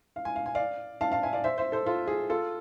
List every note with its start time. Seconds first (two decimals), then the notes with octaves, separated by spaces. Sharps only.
0.16 F5
0.25 G#5
0.36 F5
0.46 G#5
0.55 D5 F5
1.01 F5 A5
1.12 F5 A5
1.22 E5 G#5
1.33 D5 F5
1.44 C5 E5
1.58 C5 E5
1.72 A4 C5
1.86 F4 A4
2.07 G#4
2.29 F4 A4